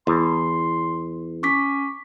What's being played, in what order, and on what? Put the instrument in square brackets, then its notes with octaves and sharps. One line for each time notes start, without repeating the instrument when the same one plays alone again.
[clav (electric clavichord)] E2 [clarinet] C6
[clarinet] C#4 [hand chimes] C#6 D6 B6